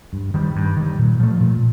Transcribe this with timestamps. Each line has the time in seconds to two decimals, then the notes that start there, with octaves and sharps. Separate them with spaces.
0.13 G2
0.34 D#3 G3
0.56 G2
0.77 D#3 G3
0.99 A#2
1.20 F3 A3
1.40 A#2